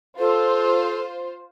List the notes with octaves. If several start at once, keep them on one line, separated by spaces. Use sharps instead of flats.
F4 A4 C5